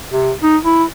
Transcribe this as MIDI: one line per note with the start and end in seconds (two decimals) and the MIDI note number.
0.12 0.33 48
0.43 0.57 63
0.65 0.84 64